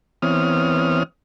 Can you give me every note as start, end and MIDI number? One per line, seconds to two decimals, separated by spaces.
0.22 1.03 52
0.22 1.03 59
0.22 1.03 60
0.22 1.03 73
0.22 1.03 87
0.22 1.03 89